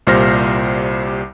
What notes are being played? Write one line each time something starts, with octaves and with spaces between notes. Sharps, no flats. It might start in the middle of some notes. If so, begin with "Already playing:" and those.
C2 A#2 G3 C5 F6 A#6